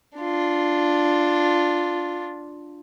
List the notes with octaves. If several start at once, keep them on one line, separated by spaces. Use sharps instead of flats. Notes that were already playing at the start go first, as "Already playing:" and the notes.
D4 F4